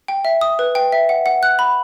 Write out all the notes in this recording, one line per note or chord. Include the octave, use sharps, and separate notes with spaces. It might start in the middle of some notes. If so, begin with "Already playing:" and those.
G5
E5
D#6
B4
G5
E5
F#5
F#5
F#6
B5